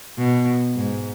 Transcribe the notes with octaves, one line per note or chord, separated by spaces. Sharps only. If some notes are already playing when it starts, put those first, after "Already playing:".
B2
G#2